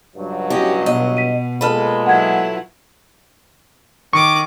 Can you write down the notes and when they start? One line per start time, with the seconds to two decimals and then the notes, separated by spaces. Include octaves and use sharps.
0.16 C#2 G2 F#3
0.50 C#4 E4 F#4 G4 D#5
0.86 B2 D#5
1.17 B6 D#7
1.61 A#2 G#3 A4 B4 B5 F6
2.06 F#3 E4 F4 F#5 G#6
4.13 D#3 C#6 D6